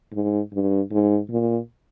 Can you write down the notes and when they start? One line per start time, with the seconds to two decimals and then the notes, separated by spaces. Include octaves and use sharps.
0.13 G#2
0.53 G2
0.92 G#2
1.30 A#2